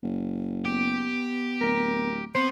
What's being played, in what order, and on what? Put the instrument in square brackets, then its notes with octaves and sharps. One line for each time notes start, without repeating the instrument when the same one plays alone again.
[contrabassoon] F#1
[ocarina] B3 [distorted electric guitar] G4
[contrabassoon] D1 [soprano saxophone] A#4
[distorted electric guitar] B3 [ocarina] C4 [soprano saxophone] C5